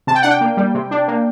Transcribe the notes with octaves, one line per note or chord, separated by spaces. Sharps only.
C3 A5
G5
D4 F#5
G5
A#3
G3
C3
D4
A#3